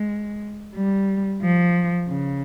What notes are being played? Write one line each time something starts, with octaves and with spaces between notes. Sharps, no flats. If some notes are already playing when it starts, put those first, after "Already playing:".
Already playing: G#3
G3
F3
C#3